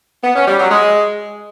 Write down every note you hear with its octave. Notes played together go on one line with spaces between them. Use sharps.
B3
C#4
G3
F#3
G#3